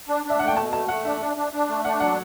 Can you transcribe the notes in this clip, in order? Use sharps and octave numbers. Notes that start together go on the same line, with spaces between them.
D4
D4 E5
A3 F#5
G5
B2 A5
A3 A5
A3 F#5
D4 E5
D4
D4
D4
A3
D4 F#5
F#3 F#5